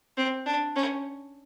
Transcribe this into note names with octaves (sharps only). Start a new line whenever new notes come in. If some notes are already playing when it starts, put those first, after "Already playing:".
C4
D4
C#4